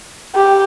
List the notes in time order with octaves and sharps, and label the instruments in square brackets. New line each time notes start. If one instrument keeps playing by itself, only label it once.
[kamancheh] G4